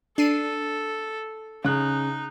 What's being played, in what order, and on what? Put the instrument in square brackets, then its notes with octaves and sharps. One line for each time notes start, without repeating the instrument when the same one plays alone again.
[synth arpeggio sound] D4 C7 D#7 [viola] A4
[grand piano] C#3 F#6 [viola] D#4